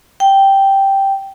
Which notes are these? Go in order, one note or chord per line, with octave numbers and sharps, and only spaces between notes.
G5